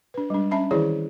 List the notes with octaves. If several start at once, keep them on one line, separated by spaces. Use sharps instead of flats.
D4 B4
G3 G#3 D4
C#4 E5 A5 B5
D#3 E3 E4 G#4 C#5 D5